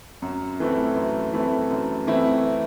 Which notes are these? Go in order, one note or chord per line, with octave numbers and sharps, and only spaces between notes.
F#2
E3 A3 C4 E4
F#2
E3 A3 C4 E4
F#2
E3 A3 C4 E4